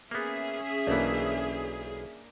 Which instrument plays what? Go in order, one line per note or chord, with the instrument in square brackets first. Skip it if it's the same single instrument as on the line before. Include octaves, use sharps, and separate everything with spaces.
[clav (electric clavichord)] A#3 B3 [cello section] C#4 E5 [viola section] G#4
[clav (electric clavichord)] B1 E3 [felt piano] A#3 D4